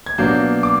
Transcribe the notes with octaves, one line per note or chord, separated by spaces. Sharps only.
G#6
B2 F#3 A#3 D4 G6
D6